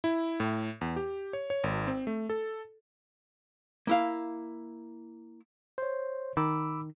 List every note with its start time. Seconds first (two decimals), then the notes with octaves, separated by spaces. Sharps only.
0.04 E4
0.40 A2
0.81 E2
0.96 G4
1.33 C#5
1.50 C#5
1.64 G#1
1.87 C4
2.07 A3
2.30 A4
3.87 A#3 E4 F5
5.78 C5 C#5
6.37 D#3 B5 D6 E6